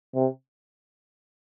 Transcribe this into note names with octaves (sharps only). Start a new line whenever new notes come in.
C3